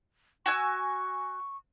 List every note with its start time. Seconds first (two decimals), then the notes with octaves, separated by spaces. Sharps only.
0.46 F#4 G#5 C#6 E6